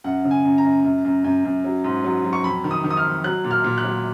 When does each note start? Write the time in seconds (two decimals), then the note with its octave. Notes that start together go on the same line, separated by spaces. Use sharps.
0.04 F#2 F#5
0.24 C#3
0.31 G#5
0.45 F#2
0.58 A#5
0.65 F#2
0.84 F#2
1.04 F#2
1.24 F#2
1.44 F#2
1.64 F#3
1.84 G#2
2.04 F#3
2.24 F#3
2.33 C#6
2.44 F2 B5
2.64 D#3
2.71 D#6
2.84 D#3
2.90 D#6
2.97 F6
3.04 F2
3.24 F#3 F#6
3.44 A#2
3.51 F6
3.64 A#2
3.78 F#6
3.84 F#3